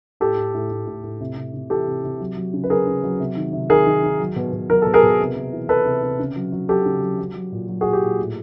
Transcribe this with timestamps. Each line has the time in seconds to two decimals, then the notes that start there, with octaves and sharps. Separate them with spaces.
0.20 A2 G4 A4
0.37 A2
0.54 A2
0.71 A2
0.87 A2
1.04 A2
1.21 C3
1.36 C3
1.54 C3
1.70 E3 G4 A4
1.88 C3
2.04 C3
2.20 F#3
2.36 F#3
2.53 C#3
2.64 B4
2.70 F#3 G#4 A#4
2.87 C#3
3.04 F#3
3.20 C3
3.37 D#3
3.53 C3
3.70 D#3 G#4 A#4
3.86 D#3
4.03 D#3
4.20 F#3
4.36 B2
4.53 B2
4.70 F#3 A#4
4.82 B2 A4
4.94 G#4 A#4
5.03 B2
5.20 C3
5.36 C3
5.52 E3
5.69 E3 A4 B4
5.85 C3
6.03 C3
6.19 C#3
6.36 F#3
6.52 F#3
6.69 F#3 G4 A4
6.86 C#3
7.02 F#3
7.19 F#3
7.35 F#3
7.52 A#2
7.68 F#3
7.81 F#4 G#4
7.85 A#2
7.93 G4
8.02 A#2
8.19 A2